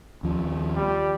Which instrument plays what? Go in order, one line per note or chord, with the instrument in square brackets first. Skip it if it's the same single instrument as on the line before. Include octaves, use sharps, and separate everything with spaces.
[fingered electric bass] D#2 F3
[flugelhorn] G3